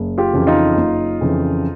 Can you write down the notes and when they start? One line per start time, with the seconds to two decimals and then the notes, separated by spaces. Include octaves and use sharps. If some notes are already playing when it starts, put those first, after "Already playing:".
Already playing: F#1
0.18 F4 G4
0.33 F2 C#3 E3
0.47 D#4 F4
0.77 F#1
1.21 F2 C#3 E3